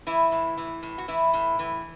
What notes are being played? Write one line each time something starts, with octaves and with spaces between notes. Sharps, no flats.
E3 E4
A2
E3
A2
F#4
E3 E4
A2
E3